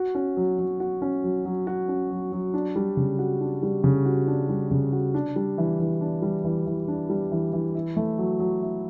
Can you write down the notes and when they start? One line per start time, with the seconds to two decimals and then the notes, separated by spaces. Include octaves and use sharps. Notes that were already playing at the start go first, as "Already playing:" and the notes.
Already playing: F#4
0.15 C#4
0.37 F#3
0.59 F#3
0.80 F#4
1.02 C#4
1.24 F#3
1.45 F#3
1.67 F#4
1.88 C#4
2.10 F#3
2.32 F#3
2.54 D4
2.76 G3
2.97 C#3
3.19 F#4
3.40 D4
3.63 G3
3.84 C#3
4.05 F#4
4.27 D4
4.49 G3
4.71 C#3
4.92 F#4
5.14 D4
5.36 G3
5.58 E3
5.80 E3
6.01 D4
6.22 G3
6.44 E3
6.66 E3
6.88 D4
7.10 G3
7.32 E3
7.53 E3
7.75 E4
7.97 A3
8.18 F#3
8.40 F#3
8.62 E4